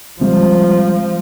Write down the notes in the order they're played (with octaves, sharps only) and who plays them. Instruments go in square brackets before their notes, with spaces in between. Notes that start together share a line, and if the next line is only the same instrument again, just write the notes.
[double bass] F3 [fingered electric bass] G3 G#3 C4